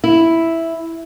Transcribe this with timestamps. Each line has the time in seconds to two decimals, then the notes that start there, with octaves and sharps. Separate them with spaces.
0.04 E4